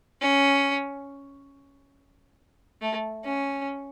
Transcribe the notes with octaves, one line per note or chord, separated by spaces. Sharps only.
C#4
A3
C#4